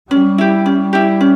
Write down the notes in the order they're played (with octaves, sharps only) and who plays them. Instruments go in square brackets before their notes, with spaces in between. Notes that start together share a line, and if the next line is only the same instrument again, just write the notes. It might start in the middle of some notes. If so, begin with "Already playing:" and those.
[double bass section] G3 [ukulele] C#4
[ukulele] E4 G4
C#4
E4 G4
C#4